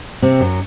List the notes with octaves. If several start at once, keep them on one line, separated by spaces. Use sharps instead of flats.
C3 C4
F#2 F#3